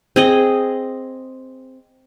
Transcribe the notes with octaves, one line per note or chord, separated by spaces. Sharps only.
C4 G#4 D#5